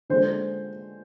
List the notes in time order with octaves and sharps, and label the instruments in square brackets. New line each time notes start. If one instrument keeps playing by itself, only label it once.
[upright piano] D3 G#3 C5